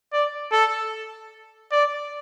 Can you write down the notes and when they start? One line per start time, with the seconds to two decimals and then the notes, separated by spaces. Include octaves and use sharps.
0.13 D5
0.52 A4
1.72 D5